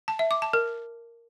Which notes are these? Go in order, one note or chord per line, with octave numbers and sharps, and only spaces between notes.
A5
E5
D6
A5
A#4